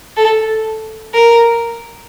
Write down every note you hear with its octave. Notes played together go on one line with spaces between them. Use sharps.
A4
A#4